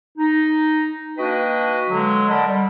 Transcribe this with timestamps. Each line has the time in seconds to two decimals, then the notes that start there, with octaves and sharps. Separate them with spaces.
0.17 D#4
1.17 A#3 D4 F#4 B4 D#5 G5
1.89 D3 F#3 G#3
2.29 A#4 D5 D#5 F#5 A5 B5
2.46 G3